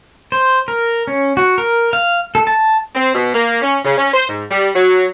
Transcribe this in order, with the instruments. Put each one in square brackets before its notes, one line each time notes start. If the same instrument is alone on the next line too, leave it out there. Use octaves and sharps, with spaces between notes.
[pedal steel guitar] C5
A#4
C#4
F#4
A#4
F5
A4
A5
[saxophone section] C4
B2
A#3
C#4
C#3
C#4
C5
G#2
G3
F#3